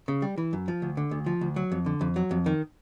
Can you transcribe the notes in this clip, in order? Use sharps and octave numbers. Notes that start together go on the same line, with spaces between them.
C#3
G3
E3
F#2
F3
D2
D3
D2
F3
D2
F#3
F2
D3
F2
F#3
F2
D#3